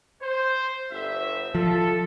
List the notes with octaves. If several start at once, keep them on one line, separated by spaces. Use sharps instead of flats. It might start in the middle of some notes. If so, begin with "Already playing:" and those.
C5
G1 E5
F3 A4